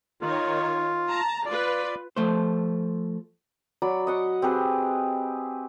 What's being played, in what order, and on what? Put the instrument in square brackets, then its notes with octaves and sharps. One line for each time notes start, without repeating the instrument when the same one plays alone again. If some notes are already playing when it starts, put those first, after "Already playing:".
[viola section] D#3 C#5 [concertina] F4
[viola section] A5 A#5
[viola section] F4 B4 [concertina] D5
[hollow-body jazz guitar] F3 A3 C5
[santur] F#3 D5 B5
D#5 F#5 C#6
C4 G4 G#4 B4